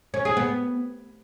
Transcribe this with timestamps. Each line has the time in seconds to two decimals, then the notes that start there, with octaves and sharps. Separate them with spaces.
0.14 C#4
0.25 G#4
0.37 B3